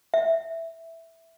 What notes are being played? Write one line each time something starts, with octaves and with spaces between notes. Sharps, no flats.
E5